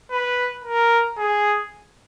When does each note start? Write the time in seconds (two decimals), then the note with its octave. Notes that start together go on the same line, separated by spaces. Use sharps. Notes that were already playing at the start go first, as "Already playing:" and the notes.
0.11 B4
0.64 A#4
1.18 G#4